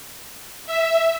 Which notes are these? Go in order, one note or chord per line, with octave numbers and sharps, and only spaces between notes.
E5